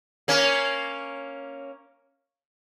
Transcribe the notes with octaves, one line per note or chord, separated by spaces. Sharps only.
A#3 C#4